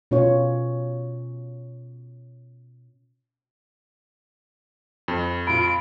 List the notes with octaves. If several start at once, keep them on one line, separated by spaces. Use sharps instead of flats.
B2 C#4 F4 C#5
F2
F4 B5 D7